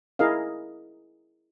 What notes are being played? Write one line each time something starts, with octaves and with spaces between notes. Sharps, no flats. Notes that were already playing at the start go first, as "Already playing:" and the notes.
E4 G#4 A#4 D#5 F5